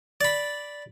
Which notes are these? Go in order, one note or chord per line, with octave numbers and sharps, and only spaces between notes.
D5 B5